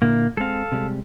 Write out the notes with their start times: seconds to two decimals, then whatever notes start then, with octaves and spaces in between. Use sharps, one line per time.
0.02 A#2 D3 A#3 E4
0.37 G#3 C4 A4 F5
0.72 C3 G3 G#3